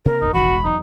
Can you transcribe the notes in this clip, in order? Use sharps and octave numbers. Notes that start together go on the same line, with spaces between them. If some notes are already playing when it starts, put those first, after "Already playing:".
C3 A#3 C4 A#4
G1 E2 D#4
E1 A1 E2 D#3 E3 F#4 B5
G#3
E2 F#3 D#4